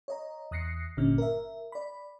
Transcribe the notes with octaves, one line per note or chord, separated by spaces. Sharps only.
C#5 D#5 A#5
E2 D#6 F#6 A#6 C7 C#7
G1 A#2 D3 C#4 F6
A#4 E5
D5 B5